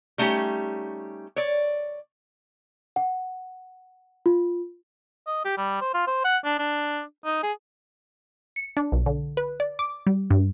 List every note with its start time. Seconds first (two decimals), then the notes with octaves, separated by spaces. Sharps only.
0.18 G3 A3 C#4 D#4 G4
1.36 C#5 D5
2.96 F#5
4.26 F4
5.27 D#5
5.45 G4
5.58 G3
5.81 C5
5.94 F4
6.07 C5
6.25 F#5
6.45 D4
6.59 D4
7.25 D#4
7.43 G#4
8.56 C#7
8.77 D4
8.92 B1
9.06 D3
9.37 B4
9.60 D5
9.79 D6
10.07 G3
10.30 G2